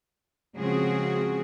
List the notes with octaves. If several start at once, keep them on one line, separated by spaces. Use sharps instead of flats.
C#3 F3 G#3 C4 F#4 G#4